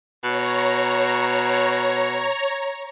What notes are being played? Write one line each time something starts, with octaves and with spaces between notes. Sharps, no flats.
B2 C#5 A#5